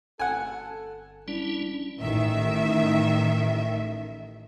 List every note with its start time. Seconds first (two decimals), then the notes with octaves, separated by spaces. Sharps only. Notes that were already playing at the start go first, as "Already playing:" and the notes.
0.19 G1 A4 F#5 G#5
1.28 G3 C#4 D4 E4
2.01 A1 D#3 E5